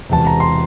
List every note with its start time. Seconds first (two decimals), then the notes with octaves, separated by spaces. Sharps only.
0.09 E1 E2 C3 A5
0.27 A#5
0.40 C6